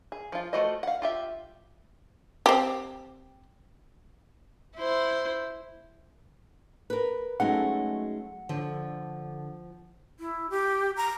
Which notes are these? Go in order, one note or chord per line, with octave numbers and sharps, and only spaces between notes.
G#4
F3 F4
A3 F4 F#4 C5 D#5
F5 F#5
F4 G4 E5
C4 G4
E4 C5
A#4 B4
F#3 G#3 A3 C#4 D#4 F#4 F#5
D3 F3
E4
G4
A#5